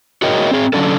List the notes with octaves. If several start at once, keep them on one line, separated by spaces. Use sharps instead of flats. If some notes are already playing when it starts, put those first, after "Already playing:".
F#4 G#4 A#4 C#5 D#5 G5
C4 G#4
D3 F#3 C#4 D4 A4